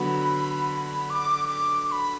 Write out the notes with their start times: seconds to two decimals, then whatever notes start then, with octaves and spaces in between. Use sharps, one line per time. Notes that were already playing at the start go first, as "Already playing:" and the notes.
Already playing: D3 F#3 B3 F#4 B5
1.10 D6
1.48 D6
1.87 D6
1.91 B5